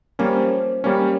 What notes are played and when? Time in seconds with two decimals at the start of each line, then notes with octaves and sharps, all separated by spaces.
0.19 F3 G3 A#3 C#4
0.84 G3 A#3 C#4